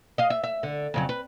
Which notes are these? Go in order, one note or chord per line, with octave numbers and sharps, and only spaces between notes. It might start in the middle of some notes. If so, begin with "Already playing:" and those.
D#5 F5
E5
E5
D3
F2 C#3 F#3
B4